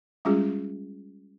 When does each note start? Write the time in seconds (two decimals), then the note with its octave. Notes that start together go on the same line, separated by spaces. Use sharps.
0.25 G3 G#3 C#4 F4 G#4